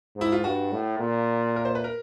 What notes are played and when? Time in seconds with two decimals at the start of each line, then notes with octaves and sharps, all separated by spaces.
0.16 G#2
0.21 E4
0.32 F4
0.44 G2 F#4
0.72 A2
1.00 A#2
1.56 A#4
1.65 C5
1.75 B4
1.84 A#4